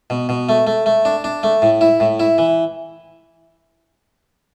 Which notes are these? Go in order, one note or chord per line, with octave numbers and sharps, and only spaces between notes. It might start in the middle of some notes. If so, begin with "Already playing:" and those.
B2
B2
A3
A3
A3
D4
D4
A3
A2
E4
A2
E4
E3